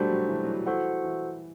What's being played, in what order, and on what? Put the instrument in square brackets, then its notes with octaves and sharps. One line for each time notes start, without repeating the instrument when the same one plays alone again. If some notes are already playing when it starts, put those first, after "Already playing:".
Already playing: [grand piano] G3 A3 [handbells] D4 F#4 C5
[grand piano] F#3
E3
F#3
E3
[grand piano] E3 [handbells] F#4 A4 C5 F#5
[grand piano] E3